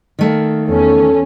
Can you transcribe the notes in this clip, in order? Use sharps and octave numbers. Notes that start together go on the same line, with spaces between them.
D#3 A3 A#3
E2 C#4 A4